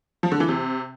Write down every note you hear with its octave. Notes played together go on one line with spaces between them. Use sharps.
F3
D3
E3
C3